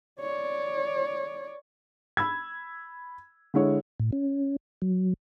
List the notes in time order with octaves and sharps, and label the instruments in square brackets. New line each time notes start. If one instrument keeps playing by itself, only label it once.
[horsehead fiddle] C#5 D5
[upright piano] B5 E6 G#6
D3 G#3 E4 C#5
[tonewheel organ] A2
C#4
F#3